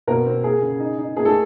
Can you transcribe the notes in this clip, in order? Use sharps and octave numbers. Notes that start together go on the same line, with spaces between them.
B2 A#3 A#4
C4
A#3 G#4
C#3
D#4
D#4
A#3 G#4
A3 A4